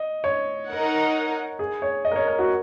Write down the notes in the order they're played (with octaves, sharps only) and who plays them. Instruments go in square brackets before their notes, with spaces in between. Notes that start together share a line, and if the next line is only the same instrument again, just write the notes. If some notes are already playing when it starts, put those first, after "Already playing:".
Already playing: [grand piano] D#5
C#5
[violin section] D#4 A#4 F#5
[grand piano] G#4
C#5
D#5
A#4
C#5
A#4
F#4